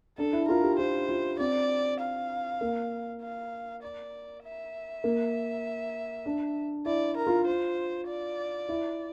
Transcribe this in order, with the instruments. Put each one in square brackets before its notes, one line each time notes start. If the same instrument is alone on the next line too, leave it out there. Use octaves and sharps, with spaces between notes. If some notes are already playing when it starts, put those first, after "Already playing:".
[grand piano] D4 [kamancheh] A4
[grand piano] E4
[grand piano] F4 [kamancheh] A#4
[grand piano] G4
[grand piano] F4 [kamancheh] C5
[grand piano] F4
[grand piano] C4 [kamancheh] D5
[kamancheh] F5
[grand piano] A#3
[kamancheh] F5
D5
E5
[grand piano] A#3
D4
[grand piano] E4 [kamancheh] D5
[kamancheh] A#4
[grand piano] F4
[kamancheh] C5
D5
[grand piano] E4